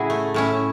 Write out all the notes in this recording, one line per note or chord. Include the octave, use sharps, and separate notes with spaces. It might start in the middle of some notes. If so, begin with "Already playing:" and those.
Already playing: A2 C#3 F#3 E4 F#4 G#4
A3
A2 C#4 E4